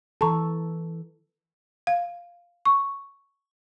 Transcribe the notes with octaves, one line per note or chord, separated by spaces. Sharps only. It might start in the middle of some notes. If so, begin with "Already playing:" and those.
E3 A4 A5 A#5 C#6
F5
C#6